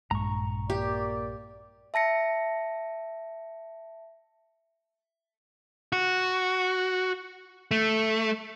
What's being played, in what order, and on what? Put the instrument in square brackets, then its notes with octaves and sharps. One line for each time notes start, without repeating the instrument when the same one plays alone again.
[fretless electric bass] A#1 G2 G#3 [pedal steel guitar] A#5 C#6
[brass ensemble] A#3 D5 [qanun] G4
[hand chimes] E5 A5 A#6 C#7
[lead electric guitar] F#4
A3